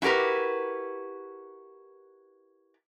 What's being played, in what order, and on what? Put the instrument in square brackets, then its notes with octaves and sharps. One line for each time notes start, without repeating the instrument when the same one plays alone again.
[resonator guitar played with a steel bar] E4 F#4 G4 A#4 B4